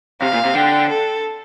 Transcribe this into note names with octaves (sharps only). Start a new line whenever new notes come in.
C3 F5
A#2
C3
D3 G5
A4